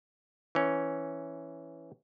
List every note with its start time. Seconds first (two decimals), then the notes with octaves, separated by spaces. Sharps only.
0.55 E3 C#4